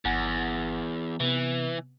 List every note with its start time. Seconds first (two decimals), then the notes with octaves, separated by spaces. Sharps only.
0.05 G1 E2 F#5 G#5
1.20 C3 E3 B3